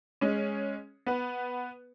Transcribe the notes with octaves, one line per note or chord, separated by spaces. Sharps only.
G#3 C#4
B3 B4